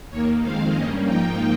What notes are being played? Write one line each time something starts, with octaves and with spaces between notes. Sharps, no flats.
D#2 D#3 A#3 C#5
F2 D#3 G#3 C4 F5
G2 G3 A#3 C#4 D#5
G#2 F3 A#3 D#4 G5